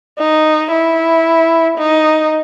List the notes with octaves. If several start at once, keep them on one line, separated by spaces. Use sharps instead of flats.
D#4
E4
D#4